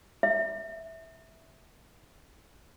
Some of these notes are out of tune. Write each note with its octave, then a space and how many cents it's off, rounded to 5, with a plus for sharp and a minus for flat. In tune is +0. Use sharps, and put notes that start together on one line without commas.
E5 -15